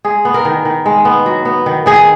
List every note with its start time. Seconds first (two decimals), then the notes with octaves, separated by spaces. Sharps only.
0.05 G#3 G#4
0.25 B3
0.34 A#4
0.45 D#3
0.65 D#3
0.86 G#3
1.05 B3
1.26 F#3
1.45 B3
1.66 D#3
1.86 D#3 G#4